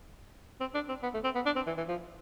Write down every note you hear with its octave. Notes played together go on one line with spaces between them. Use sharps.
C4
D4
C4
B3
A3
C4
B3
D4
C4
E3
E3
F3